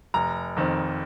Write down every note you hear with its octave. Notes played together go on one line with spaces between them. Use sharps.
F1 A#5
F2 D#3 C4